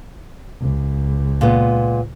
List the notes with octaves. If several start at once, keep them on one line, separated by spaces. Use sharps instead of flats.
C#2
A#2 G#3 B3